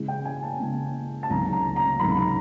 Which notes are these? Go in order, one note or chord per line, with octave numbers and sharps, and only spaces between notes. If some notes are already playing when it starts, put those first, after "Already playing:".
Already playing: C#3 E3 G#3
G5
G#5
A5
C#3 E3 G#3
A5
C#2 C3 D#3 F#3 A#5
A#5
A#5
C#2 C3 D#3 F#3 B5
A#5